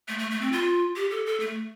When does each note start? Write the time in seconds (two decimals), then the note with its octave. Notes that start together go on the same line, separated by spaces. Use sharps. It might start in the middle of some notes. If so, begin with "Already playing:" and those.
0.08 A3
0.19 A3
0.31 A3
0.41 C4
0.52 F4
0.96 G4
1.11 A4
1.26 A4
1.40 A3